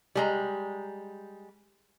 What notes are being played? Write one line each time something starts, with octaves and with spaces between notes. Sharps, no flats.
G3 G#3 A#5